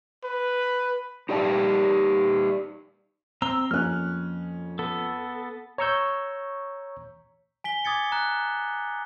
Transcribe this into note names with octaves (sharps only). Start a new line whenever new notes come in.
B4
D#4 G4 D5 F#5 A5
C4 A#5 E6 G7
F2 A#3 C#4 F6 F#6
B3 A4
C#5 A#5 C#6 E6 G6
G#5 B6 G7
G#5 D6 D#6 G#6 A6 C#7
A#5 F#6